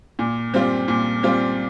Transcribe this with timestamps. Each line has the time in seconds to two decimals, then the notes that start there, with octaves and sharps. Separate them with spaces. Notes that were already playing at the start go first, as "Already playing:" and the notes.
0.19 A#2
0.54 G3 C4 F4
0.88 A#2
1.23 G3 C4 F4